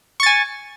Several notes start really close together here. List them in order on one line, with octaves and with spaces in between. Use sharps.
C#6 A6 G#5